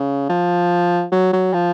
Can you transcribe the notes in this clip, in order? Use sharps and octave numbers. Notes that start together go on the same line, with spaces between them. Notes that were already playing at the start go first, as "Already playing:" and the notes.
Already playing: C#3
F3
F#3
F#3
F3